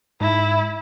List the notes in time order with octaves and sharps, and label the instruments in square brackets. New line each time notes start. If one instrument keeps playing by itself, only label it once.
[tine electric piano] G#2 [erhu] E4